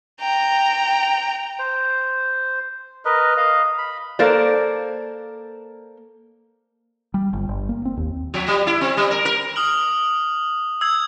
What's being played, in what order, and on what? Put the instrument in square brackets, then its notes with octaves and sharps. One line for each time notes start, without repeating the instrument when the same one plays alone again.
[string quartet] G5 A#5
[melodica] C5
A#4 B4 D#5
D#5 F5
B5
[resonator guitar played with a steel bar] A#3 A4 A#4 C5 D5
[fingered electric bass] G3
G1
G1
A#3
C4
D#2
[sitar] F3
G3
E4
C4
G3
A#4
A#4
[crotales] D#6 F6 F#7
E6 G#6 F#7